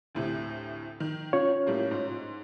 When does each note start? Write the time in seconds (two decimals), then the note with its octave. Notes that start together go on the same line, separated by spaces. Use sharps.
0.15 D2 A2 C3
1.00 D#3
1.33 C#4 F4 C#5
1.66 A2 G3 A#3
1.91 G#2